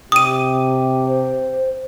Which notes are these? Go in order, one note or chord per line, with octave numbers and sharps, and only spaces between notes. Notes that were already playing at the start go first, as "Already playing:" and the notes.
C3 G4 D#6 D#7
C5